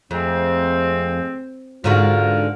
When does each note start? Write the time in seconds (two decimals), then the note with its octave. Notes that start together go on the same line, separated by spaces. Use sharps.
0.11 F2 G#3 A3 C4
1.84 G#2 D3 F4 F#4 A#4